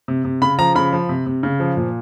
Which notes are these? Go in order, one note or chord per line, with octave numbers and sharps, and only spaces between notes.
C3
C3
C#3 B5
F3 A#5
C#3 B5
F3
C3
C3
C#3
F3
A#2